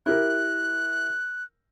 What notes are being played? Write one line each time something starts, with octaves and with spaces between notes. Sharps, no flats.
E4 G4 A#4 F#6